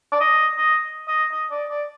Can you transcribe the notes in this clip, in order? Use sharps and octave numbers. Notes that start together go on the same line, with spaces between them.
D5
D#5
D#5
D#5
D#5
D5
D5